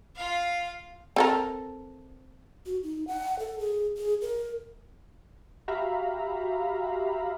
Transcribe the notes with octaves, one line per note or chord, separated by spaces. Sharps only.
F4 F5
C4 A4 A#4
F#4
D#4
F#5
A4
G#4
G#4
A#4
F#4 G4 E5 F5 A#5 B5